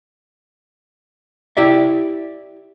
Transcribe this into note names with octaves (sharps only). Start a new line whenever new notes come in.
E4 G4 D5 E5